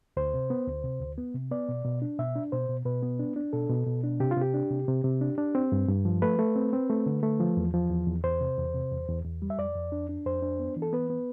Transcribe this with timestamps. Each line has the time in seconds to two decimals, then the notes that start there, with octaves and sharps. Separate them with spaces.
0.17 D2 C5
0.34 C3
0.50 B3
0.67 D2
0.84 C3
1.00 D2
1.18 B3
1.34 C3
1.51 B3 D5
1.69 B2
1.85 B2
2.02 D4
2.19 B2 E5
2.36 D4
2.52 B2 C5
2.69 B2
2.85 B2 B4
3.03 B3
3.20 D4
3.36 D4
3.53 B2 A4
3.69 B2
3.87 B2
4.04 D4
4.20 C3 G4
4.31 F4
4.37 C3 G4
4.54 D4
4.70 C3
4.88 C3
5.04 C3
5.21 D4
5.38 D4
5.55 C4
5.72 G2
5.88 G2
6.05 F3
6.22 A3 B4
6.39 A3
6.56 C4
6.73 C4
6.90 A3
7.06 D3
7.23 A3
7.40 F3
7.57 E2
7.74 F3
7.90 E2
8.07 E2
8.24 E2 C5
8.41 C3
8.58 E2
8.74 C3
8.92 E2
9.08 E2
9.25 E2
9.42 G3
9.50 E5
9.58 F2 D5
9.76 F2
9.92 D4
10.09 D4
10.26 F2 C5
10.42 D4
10.60 B3
10.76 E3
10.82 A4
10.93 B3 B4
11.10 B3